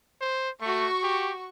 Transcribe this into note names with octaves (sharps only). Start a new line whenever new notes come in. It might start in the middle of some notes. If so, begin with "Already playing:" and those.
C5
A3 F#4 C#6
G4